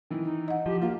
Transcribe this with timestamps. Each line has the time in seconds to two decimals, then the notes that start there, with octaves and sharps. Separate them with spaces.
0.10 D#3 E3
0.25 D#4
0.48 D#5 F#5
0.66 F3 G4
0.81 A#3 F4